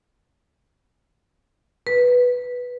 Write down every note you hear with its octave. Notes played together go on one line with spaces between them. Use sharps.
B4